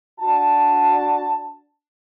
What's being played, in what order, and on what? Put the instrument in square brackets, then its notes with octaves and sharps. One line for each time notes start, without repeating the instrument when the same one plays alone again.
[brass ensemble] D4 F#4 A5